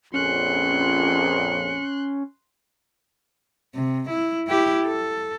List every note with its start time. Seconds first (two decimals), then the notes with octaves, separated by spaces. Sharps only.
0.14 A#1 F2 C#4 C6 F#6 C#7
3.75 C3
4.10 E4
4.47 E4 G4
4.84 A4